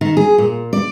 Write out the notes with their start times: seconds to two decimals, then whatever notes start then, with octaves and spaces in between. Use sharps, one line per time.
0.01 D#3
0.17 G#4
0.38 A#2
0.73 D5